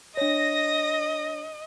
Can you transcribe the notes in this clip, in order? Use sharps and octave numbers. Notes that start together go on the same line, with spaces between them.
D4 C#5 D#5 A#6